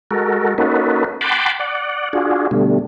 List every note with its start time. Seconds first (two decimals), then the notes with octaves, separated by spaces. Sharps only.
0.11 G#3 F#4 A4 A#4
0.58 A#3 C#4 D#4 F#4 A4 B4
1.21 F#5 G5 A5 B5 C6 D6
1.59 D5 F#5
2.13 D4 F4 F#4 G#4
2.51 B2 D3 G3 A3